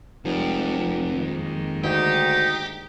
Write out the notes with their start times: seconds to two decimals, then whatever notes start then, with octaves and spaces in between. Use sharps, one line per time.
0.25 F1 F2 G3 G#3
1.09 D#3 G#3 A#3
1.83 D2 D#4 G4